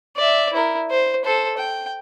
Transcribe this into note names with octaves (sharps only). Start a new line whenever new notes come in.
D5 E5
E4 A#4
C5
A4 C5
G5